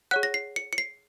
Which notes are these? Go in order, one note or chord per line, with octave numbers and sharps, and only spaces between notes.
G#4 C#5 F#5 F#6
A#6
C7
C#7
C#7
C7